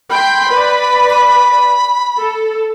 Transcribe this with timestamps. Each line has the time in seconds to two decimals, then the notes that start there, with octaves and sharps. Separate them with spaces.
0.11 G5 B5 C6
0.49 B4 D5
1.10 B5
2.18 A4